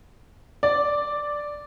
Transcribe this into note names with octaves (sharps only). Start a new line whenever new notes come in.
D5